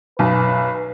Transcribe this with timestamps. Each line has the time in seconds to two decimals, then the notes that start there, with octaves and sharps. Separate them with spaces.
0.19 B1 F#2 B4